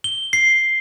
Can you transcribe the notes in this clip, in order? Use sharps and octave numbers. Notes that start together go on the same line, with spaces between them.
G7
C7